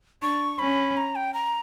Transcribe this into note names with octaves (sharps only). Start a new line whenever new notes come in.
D4 C#6
C#4 B5
A#5
G5
A#5